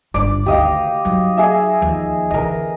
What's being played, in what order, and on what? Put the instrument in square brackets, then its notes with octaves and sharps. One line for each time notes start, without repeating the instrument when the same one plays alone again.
[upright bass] G1 D4 [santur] D5
[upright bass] D2 D#3 [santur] G4 D#5 F5
[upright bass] F#3 D#4
[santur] G#4 D#5 E5
[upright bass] D#2 F3
[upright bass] E2 D3 [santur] A#4 D#5